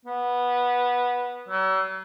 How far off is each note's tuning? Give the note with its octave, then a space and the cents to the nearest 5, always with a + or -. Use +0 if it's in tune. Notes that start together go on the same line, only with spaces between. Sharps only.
B3 -10
F#3 +45